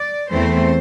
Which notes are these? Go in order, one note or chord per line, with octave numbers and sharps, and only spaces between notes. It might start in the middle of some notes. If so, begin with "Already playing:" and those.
Already playing: D5
E2 E3 A3 C4 C5